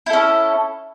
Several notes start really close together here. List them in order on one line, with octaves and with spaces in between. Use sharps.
E4 A4 C#4